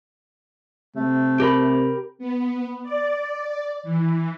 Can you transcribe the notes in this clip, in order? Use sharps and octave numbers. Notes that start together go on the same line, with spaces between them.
C3 A3
G4 A#4 B5
B3
D5
E3